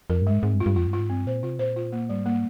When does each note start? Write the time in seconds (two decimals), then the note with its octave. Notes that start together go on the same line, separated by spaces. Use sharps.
0.10 F2 A#4
0.22 G2 G#3
0.32 G#2
0.43 G#2 C4
0.54 G2
0.60 F4
0.66 G2
0.76 F2 F4
0.87 G2
0.93 F4
0.99 G#2
1.10 G2 C4
1.27 A#2 C5
1.43 C3 F4
1.59 A#2 C5
1.76 F4
1.92 A#3
2.09 G#2 G3
2.26 A#3